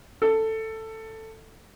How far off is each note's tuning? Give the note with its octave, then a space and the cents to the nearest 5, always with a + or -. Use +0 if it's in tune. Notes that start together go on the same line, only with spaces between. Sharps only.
A4 +10